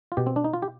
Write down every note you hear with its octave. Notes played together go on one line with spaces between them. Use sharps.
F4
B2 G4
C4
D4
D#4
F4
G4